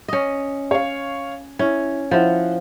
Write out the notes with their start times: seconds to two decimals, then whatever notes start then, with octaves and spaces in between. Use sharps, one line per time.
0.08 C#4 D#5
0.71 C#5 F5
1.59 C#4 E4
2.11 F3 E4 C5 F#5